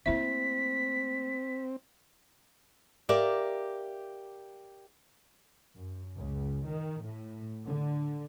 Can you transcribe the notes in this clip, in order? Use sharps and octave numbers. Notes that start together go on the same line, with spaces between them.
A3 A#3 C4 E4 E5 B6
G4 A#4 D5 E5 F5
F#2
C#2
D#3
A2
D3